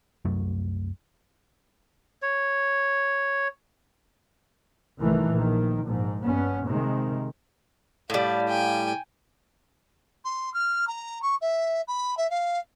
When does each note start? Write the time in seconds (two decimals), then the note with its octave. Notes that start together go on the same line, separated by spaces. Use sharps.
0.25 C2 F#2 F#3 A3
2.22 C#5
5.00 C2 D#3 E3 A3
5.30 A#1 D#3
5.86 A#1 G#2
6.24 G2 B3 C#4
6.65 C3 D#3 G#3
8.10 A2 G3 D5 F5
8.48 G5 G#5
10.24 C6
10.54 F6
10.87 A#5
11.22 C#6
11.41 E5
11.87 B5
12.17 E5
12.30 F5